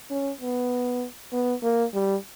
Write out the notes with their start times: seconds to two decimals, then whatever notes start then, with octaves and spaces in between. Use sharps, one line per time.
0.11 C#4
0.41 B3
1.33 B3
1.63 A#3
1.94 G3